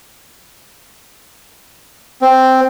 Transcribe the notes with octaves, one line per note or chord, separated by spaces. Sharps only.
C4